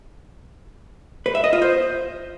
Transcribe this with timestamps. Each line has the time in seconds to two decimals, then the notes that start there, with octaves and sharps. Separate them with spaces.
1.26 B4
1.35 E5
1.44 D#5
1.53 F4
1.62 C5